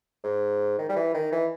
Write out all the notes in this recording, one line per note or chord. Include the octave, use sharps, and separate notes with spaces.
G#2
D#3
G3
E3
D#3
E3